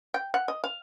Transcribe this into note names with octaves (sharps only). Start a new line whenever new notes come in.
G5
F#5
D#5
F5